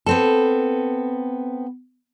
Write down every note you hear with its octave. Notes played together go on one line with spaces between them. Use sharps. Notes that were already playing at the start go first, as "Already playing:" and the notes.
B3 C4 A4